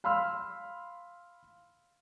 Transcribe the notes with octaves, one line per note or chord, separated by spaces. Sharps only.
F5 B5 C6 E6 F6